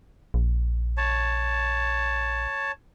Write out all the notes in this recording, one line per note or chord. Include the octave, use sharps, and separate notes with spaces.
A#1
C#5 A5